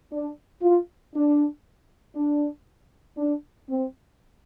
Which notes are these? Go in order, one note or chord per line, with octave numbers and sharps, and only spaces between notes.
D4
F4
D4
D4
D4
C4